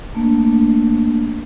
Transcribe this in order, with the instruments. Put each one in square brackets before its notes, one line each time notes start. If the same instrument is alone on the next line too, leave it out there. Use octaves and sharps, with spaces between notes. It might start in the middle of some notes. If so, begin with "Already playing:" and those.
[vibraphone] A3 A#3 D4